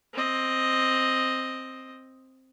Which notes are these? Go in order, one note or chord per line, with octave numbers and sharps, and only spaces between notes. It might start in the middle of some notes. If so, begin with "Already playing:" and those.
C4 D#5